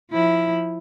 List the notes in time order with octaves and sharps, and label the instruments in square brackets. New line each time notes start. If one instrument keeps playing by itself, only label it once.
[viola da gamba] F3 E4